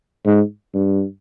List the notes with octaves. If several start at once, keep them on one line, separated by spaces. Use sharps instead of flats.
G#2
G2